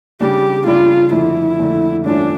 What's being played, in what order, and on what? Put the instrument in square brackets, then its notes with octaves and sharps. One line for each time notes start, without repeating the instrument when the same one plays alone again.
[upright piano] C#3 G3 D4 [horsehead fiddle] G4
[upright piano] C#3 G3 D4 [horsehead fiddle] F4
[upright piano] F2 D3 A3 [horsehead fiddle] E4
[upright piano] F2 D3 A3
[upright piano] A1 G2 F3 A3 C#4 [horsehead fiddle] D4